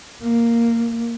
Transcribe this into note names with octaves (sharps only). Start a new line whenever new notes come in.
A#3